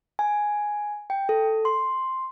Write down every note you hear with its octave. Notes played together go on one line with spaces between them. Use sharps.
G#5
G5
A4
C6